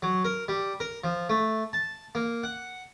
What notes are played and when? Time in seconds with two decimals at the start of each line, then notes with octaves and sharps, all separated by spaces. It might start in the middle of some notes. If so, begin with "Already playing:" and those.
0.02 F#3
0.25 A#4
0.48 G3
0.80 A#4
1.04 F3
1.29 A3
1.73 A5
2.15 A#3
2.43 F#5